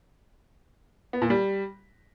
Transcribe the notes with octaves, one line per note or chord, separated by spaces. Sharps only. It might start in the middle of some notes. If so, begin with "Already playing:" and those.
B3
A#2
G3